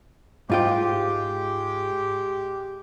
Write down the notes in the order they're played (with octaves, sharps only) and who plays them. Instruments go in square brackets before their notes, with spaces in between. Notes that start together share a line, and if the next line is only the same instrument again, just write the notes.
[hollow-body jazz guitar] G#2 F4 G5 [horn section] G#3 G4